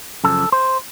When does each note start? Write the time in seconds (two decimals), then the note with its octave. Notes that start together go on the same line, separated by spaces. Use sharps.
0.24 F#2 C#3 F3 A4
0.52 C5